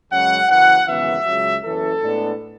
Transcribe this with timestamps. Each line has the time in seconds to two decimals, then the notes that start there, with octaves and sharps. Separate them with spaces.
0.10 F#2 C#3 G#3 C#4 F#5
0.49 F#1 F#2 E3 F#5
0.87 G#1 F#2 C#3 E3 B3 E5
1.26 C#2 C#3 F#3
1.63 F#1 E2 C#3 E3 A4
2.01 A2 G#3 B3 D4